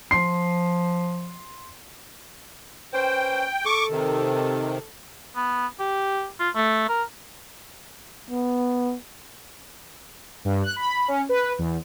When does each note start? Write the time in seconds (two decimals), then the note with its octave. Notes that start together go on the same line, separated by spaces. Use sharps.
0.11 F3 C6 C7
2.94 C#4 B4 C5 G5
3.65 A4 C#6 D6
3.90 C3 D#3
5.36 B3
5.80 G4
6.40 F4
6.55 A3
6.89 A#4
8.31 B3
10.45 G2
10.64 F#6
10.76 B5
11.08 C#4
11.29 B4
11.59 E2